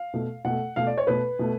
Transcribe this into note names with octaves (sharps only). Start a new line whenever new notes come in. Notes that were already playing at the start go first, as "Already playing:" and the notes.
Already playing: F5
B2 A3
B2 A3 F#5
B2 A3 F5
D5
C#5
B2 A3 B4
B2 A3